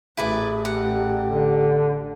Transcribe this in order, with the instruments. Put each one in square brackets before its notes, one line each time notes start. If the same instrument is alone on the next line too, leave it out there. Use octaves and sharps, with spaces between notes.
[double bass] A1 [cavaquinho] E4 B4 D5 [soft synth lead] G#4
[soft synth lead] G4 [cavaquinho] F#5
[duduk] D3